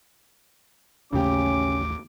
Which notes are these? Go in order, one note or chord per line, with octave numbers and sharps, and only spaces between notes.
A1 D#2 C#3 A3 C#4 G4 D6